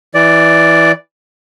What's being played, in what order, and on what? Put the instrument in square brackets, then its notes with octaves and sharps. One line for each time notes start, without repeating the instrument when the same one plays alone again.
[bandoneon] E3 D5